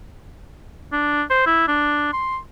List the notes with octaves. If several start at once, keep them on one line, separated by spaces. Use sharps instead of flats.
D4
C5
E4
D4
C6